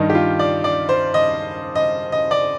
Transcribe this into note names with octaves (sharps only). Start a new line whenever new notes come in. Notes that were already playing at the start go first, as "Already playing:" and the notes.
Already playing: G2 D#3 D#4
G4
F4
D5
D5
C5
D#5
D#5
D#5
D5